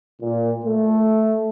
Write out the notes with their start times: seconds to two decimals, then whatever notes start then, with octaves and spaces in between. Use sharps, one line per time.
0.22 A#2
0.65 A3